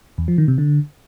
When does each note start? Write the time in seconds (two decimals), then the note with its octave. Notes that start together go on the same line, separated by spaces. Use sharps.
0.18 E2
0.28 F3
0.38 D#3
0.48 C3
0.58 D3